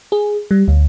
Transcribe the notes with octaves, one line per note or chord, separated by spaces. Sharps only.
G#4
G3
D2